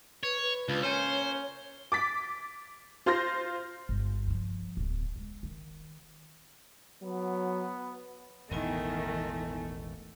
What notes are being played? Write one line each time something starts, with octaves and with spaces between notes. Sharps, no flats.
B4 C#5
B4
C#2 G3 D4 F4
A#3 C#4 C5 C#5
D6 A6 B6
F4 C5 C6 F6 G6 A#6
G1
G2 F3
D1 B3
G#3
D#3
F#3 B3
E1 A1 D#3 A3 B3 E4 G#5